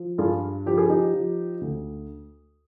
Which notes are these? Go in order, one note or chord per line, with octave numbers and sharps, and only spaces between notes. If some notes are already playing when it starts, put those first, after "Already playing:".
Already playing: F3
G2 F4 G#4
F3 G4
G#4
D#4 G4
F3
D2